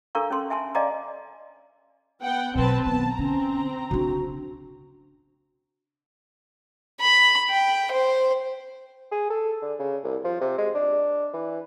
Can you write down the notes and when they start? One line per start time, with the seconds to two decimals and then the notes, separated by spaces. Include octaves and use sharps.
0.15 D4 A4 A#4 F5 A#5 C#6
0.31 C#4 A4 C6
0.50 E5 G#5 A5 C6
0.75 D5 D#5 F5 G#5 A#5 D6
2.21 B3 F#5 G5
2.55 B2 F#3 C4 B4 A5
2.86 D#3 B3 A5
3.19 D3 C4 C#4 A#5
3.91 C#3 D4 F#4
7.01 B5
7.50 G5
7.92 C5
9.12 G#4
9.30 A4
9.62 D3
9.79 C#3
10.04 C2
10.24 F3
10.41 C3
10.58 G#3
10.75 D4
11.34 E3